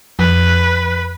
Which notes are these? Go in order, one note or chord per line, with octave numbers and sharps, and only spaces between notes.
F2 B4